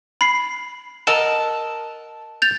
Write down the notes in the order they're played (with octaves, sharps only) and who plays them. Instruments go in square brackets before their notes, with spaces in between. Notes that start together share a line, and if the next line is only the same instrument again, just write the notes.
[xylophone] B5 C7
[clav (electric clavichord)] A#4 D#5 F#5 [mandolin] A5 E6
[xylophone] G6 A6 F7